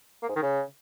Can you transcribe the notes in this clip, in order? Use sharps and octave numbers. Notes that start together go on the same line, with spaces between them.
A#3
G#2
D#3
C#3